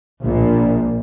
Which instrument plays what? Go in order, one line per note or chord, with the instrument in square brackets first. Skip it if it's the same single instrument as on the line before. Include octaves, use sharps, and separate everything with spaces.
[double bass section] A#1 A#2